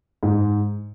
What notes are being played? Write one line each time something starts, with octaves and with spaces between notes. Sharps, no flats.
G#2